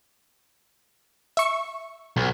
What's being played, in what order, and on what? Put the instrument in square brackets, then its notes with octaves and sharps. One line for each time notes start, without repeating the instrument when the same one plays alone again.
[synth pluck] E5 C#6
[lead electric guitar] B1